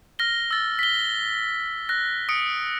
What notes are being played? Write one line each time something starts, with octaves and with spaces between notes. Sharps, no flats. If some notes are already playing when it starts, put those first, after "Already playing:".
F6 A#6 G7
E6 A6
B6 G7
F#6 A#6
D#6 C#7 D7